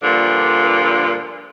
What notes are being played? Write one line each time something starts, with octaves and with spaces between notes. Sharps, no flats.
G2 A#2 D3 F3